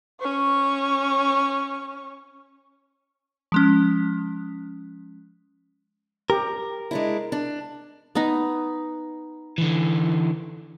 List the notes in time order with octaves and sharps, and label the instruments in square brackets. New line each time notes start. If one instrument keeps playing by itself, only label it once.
[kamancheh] C#4 C#6
[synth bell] F3 G#3 C#4
[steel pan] G4 [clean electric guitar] A#4
[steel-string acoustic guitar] G#3 D4 E4
D4
[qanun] B3 D#4
[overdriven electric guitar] D3 E3